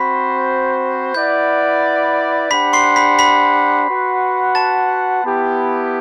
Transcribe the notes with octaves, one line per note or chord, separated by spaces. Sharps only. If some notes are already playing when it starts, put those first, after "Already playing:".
Already playing: C4 F#4 C5 B5 B6
E4 B4 D5 F#5 G6
D4 G4 C5 F#5 B5 B6
C6 C7
B5 B6
B5 B6
F#4 B4 F#5
A5 A6
B3 E4 G4